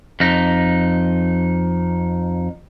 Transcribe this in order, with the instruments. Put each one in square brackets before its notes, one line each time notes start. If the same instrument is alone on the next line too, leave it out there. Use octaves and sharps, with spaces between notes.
[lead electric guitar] F2 D#4